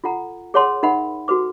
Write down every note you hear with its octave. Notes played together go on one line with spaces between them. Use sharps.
F4 A4 F#5 A#5
G#4 A#4 C#5 F#5 A5 C6
D#4 A#4 E5 F#5 B5
F#4 A4 B4 D6